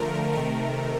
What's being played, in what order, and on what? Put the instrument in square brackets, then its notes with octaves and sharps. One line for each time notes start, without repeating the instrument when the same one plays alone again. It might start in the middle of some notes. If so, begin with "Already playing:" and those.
Already playing: [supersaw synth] D3 F3 A3 A#4
C3 D#3 A3 A#4